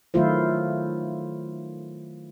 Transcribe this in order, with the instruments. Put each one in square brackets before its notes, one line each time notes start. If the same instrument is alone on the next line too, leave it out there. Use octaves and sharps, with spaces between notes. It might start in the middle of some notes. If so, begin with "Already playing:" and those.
[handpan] D#3 F#3 A3 E4 F4 C5